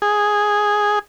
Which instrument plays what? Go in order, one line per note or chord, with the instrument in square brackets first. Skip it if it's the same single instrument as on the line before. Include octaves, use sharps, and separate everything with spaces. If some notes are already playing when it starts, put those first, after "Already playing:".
[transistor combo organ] G#4